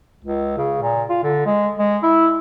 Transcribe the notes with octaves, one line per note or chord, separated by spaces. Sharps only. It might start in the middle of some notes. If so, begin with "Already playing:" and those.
C#2
C#3
A#2
F4
D3
G#3
G#3
E4